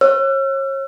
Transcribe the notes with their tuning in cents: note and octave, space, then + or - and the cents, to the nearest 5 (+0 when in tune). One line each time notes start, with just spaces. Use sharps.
C#5 -35 E6 +40